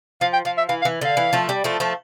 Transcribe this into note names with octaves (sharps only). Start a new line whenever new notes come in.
F3 F5
G5
F3 F5
E5
E3 F5
F5
E3
D3 F5
E3
F3 A3
G3
F3 A3
F3 A3